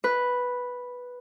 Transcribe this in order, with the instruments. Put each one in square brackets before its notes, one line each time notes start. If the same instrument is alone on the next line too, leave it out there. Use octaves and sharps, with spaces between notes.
[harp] B4